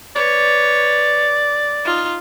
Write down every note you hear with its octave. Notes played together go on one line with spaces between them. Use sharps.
B4 C#5 D5
D#4 F4